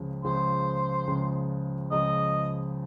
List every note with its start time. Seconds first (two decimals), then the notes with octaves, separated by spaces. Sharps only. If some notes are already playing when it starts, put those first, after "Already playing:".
Already playing: C#2 C#3 F3
0.24 C#2 C#3 F3 C5
1.07 C#2 C#3 F3
1.91 C#2 C#3 F3 D#5